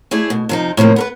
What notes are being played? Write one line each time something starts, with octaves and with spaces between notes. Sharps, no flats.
A3 E4 G#4 D5
B2
C3 F3 D#4
A2 C3 F3 A#3
B3 A#4 B4